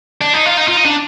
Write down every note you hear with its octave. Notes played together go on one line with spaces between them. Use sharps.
D4
D#4
F4
D#4
F4
D#4
D4